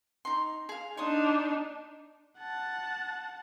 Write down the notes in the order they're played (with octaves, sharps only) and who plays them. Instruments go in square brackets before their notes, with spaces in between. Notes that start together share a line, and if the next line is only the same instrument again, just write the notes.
[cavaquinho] D#4 C6
G#4 F5
[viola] D4 D#4 [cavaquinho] C#5 C6 D#6
[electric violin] F#5 A5